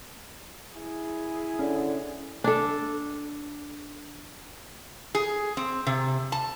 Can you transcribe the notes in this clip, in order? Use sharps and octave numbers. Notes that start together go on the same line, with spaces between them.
E4 G#4
D3 C#4
D4 A4
G#4
C4
C3
A5